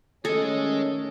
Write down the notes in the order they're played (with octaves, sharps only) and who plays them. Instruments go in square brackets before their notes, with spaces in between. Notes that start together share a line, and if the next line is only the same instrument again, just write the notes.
[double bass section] D#3 A3 C#4 [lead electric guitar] G#4 D#5 [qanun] A4